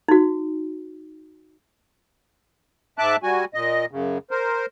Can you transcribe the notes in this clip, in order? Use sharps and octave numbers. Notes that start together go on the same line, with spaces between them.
D#4 F#4
G#2 E5 A5 D6 F#6
G3 F#4 G#5
A#2 D#5
F#2 C#3
A#4 C5